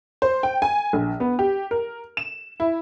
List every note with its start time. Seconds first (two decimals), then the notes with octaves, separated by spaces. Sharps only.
0.22 C5
0.43 G5
0.62 G#5
0.93 A#1
1.20 B3
1.39 G4
1.71 A#4
2.17 E7
2.60 E4